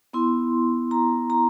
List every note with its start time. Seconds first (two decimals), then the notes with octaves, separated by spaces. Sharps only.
0.13 B3 E4 C6
0.91 A#5
1.30 A#5